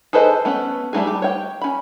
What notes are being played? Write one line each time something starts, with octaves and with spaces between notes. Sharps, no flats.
G#4 A4 B4 C5 D#5
A3 B3 C#4
G3 A3 D#4 G#4
G4
C#5 G5
C#4 B5